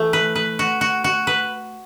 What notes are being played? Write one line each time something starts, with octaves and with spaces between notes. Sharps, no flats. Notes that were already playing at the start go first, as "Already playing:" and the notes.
Already playing: E3 A3
B4
B4
F#4
F#4
F#4
B4